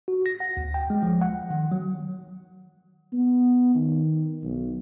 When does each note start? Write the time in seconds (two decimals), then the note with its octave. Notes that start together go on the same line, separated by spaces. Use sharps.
0.08 F#4
0.26 A#6
0.40 F#5
0.57 D2
0.74 G5
0.90 G#3
1.03 F3
1.22 F#5
1.50 D#3
1.72 F#3
3.13 B3
3.75 D#3
4.43 B1